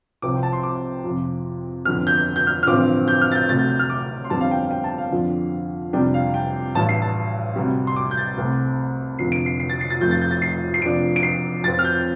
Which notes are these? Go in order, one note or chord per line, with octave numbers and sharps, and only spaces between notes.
C2 C3 F3 C4 D6
G5
A5
C6
D6
F2 C3 F3
G1 F2 D3 F6
G6
G6
F6
F6
A1 G2 D3 F3 C4 D6
G6
F6
A6
G6
D2 C3 A3 A6
G6
G6
F6
D6
C6
G1 F2 D3 G3 C4 A5
F5
G5
F5
G5
A5
F5
F2 D3 F3 D4
F2 C3 G3 D4 G5
F5
G5
A1 G2 G3 A5
C7
A5
D2 C3 G3
C6
D6
G6
A6
C2 C3 A3 C4
F1 F2 D3 F3 C7
D7
C7
C7
A6
C7
A6
F1 F2 F3 A3 G6
A6
G6
A6
C7
C7
F1 F2 F3 D4 D7
D7
C7
F2 F3 C4 A6
F6
G6